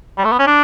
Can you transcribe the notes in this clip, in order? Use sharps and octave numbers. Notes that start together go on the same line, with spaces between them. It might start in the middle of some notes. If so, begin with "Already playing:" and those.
G3
A3
B3
C#4
D4